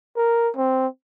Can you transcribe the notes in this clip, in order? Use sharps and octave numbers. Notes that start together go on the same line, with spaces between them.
A#4
C4